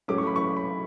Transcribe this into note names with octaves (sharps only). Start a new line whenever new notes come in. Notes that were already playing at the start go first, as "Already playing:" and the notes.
A2 F#3 A3 C#4 D6
C#6
B5
C#6
B5